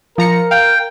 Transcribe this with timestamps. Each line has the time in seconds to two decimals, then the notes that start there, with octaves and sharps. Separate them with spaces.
0.18 F3 A#4 A#5 C#7
0.51 F5 G5